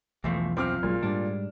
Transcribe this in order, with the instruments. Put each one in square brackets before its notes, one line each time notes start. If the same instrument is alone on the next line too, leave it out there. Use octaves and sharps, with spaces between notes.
[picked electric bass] B1 E2 [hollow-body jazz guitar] E3 F3 A3
[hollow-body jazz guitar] F#2 F3 [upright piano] C4 D6 F6
[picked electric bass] A#1 F#3 G#3 [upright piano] A#2
[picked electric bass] G#2 G3 G#3 [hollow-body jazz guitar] D4